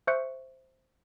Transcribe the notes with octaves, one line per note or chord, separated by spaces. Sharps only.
C5 E5 C#6 F#6 G6 C#7